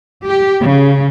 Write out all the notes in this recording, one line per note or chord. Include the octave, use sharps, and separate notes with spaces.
G4
C#3